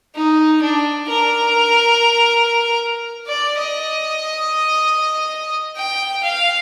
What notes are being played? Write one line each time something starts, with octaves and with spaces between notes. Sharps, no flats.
D#4
D4
A#4
D5
D#5
G5
F5